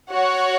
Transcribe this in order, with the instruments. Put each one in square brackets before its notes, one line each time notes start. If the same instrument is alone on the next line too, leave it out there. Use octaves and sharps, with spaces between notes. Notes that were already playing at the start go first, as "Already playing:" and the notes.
[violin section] F#4 C#5 F#5